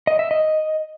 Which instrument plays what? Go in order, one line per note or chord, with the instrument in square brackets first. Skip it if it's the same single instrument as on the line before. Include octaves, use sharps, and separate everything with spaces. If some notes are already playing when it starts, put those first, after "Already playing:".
[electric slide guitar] D#5
E5
D#5